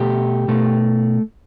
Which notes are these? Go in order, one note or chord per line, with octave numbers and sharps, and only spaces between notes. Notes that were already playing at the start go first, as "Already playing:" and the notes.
Already playing: B2 A3 G4
B2 A3